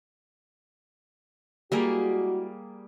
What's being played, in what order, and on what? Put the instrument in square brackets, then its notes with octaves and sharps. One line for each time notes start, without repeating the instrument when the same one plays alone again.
[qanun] G3 A#3 G#4 [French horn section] G#3 E4 F#4